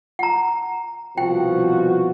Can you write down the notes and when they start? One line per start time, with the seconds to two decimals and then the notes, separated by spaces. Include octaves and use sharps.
0.19 F#5 A#5
1.18 C2 B2 F3 F#4 G5